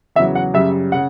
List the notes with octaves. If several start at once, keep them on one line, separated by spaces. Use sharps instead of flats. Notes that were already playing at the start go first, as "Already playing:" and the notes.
E2 C#3 F#3 E5
F#5
F#2 C#3 G3 E5
C#3 F#5